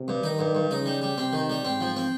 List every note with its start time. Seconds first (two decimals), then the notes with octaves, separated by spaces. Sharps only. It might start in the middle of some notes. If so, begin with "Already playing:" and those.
Already playing: C3
0.08 G2
0.23 D#3 D#4
0.39 G2
0.55 G2
0.70 C#3 D#4
0.86 G3
1.01 G3
1.17 C3 C4
1.33 D#3
1.49 G3
1.65 G#2 C4
1.81 F3
1.96 C4